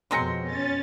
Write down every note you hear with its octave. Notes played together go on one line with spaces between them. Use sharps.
F2 B2 F#3 G#3 C4 C6 A#6 C#7
C#4 A6